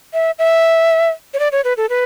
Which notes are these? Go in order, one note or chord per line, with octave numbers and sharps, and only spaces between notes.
E5
E5
C#5
D5
C#5
B4
A4
B4